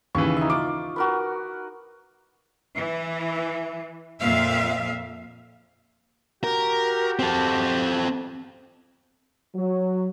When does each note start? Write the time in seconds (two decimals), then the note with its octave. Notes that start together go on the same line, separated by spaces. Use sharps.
0.15 D#2 C#3 E3 C#6
0.37 D#4 E5
0.50 F4 D6
0.96 F#4 A#4 B4
2.77 E3
4.22 F2 A#2 E5 F5
6.44 F#4 G4 A#4
7.19 C4 A4
9.55 F#3